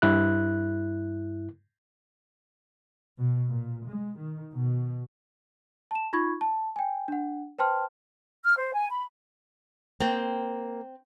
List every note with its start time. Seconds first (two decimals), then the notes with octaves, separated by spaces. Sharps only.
0.02 G2 E4 F#6
3.19 B2
3.50 A#2
3.84 G#3
4.16 D#3
4.53 B2
5.91 A5 E7
6.13 D#4 F4 B5 C#6 G#6
6.41 A5
6.76 G5 G#5
7.08 D4 F#5
7.59 B4 C5 G5 A5 C6 F6
8.44 F6
8.57 C5
8.73 G#5
8.91 B5
10.00 A#3 C4 G5